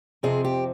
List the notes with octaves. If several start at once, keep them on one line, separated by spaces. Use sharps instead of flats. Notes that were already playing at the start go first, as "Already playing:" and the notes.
F2 C3 F3 C4 G#4
G4